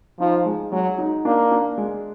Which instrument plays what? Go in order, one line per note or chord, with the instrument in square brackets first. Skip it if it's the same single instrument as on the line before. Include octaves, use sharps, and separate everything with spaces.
[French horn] F3 [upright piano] D#4
[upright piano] G#3
[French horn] F#3 [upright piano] G#3
[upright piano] D#4
[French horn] A#3 [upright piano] D4
[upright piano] D4
G#3